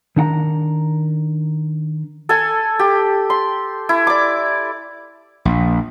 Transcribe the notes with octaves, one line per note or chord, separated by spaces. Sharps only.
D#3 D4 F#5 A#5
A4 G#5
G4
C6
E4
D5 D6
A#1